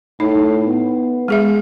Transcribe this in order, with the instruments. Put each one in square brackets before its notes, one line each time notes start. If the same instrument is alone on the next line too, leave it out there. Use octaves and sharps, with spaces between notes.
[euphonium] A2 [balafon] D#4
[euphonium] B3
[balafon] G#3 G#4 E5